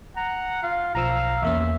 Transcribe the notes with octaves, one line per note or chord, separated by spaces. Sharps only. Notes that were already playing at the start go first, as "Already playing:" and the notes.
F#5 A#5
F4 F5
B1 F3 F5 A#5 E6
E2 A#3 C#4 E5